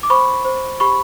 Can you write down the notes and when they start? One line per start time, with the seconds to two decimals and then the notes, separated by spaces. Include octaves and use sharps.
0.03 D6
0.10 C5 B5 C#6
0.45 C5
0.80 G4 B5 C#6